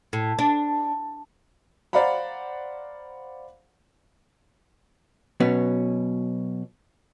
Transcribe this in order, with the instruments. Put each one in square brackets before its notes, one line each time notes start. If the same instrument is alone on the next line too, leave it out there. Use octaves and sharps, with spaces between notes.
[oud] A2
D4
[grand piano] C5 D5 F5 F#5 A#5 B5
[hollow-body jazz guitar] B2 F#3 B3 C#4